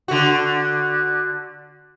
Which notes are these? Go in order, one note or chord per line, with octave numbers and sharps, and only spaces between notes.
D3 F#4